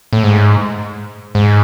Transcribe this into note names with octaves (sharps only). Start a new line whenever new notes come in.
A2
G#2
G#2